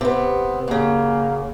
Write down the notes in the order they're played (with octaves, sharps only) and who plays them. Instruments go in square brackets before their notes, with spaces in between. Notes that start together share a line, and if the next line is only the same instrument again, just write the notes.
[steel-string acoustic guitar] C3 B3
[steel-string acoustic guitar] F#2 C#3 [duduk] A#3